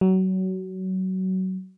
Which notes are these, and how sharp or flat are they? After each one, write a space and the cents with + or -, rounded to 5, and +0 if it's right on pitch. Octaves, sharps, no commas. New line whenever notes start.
F#3 +20